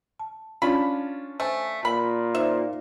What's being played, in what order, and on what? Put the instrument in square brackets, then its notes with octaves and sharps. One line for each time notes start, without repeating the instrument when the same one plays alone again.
[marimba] A5
[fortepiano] C#4 D4 F4 [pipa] B5
[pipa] A3 [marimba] C5 G#5
[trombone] A#2 [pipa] B5
[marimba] D#4 C5 D5 [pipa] E5